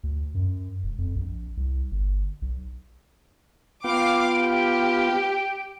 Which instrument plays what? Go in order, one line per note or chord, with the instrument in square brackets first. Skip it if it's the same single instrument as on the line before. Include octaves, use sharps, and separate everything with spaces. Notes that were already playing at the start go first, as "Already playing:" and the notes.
[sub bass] D2
F#2
E1
F2
A#1
C2
G1
B1
[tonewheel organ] B3 F4 [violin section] F5 D6 [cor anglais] G5
[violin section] G4 [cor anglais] G5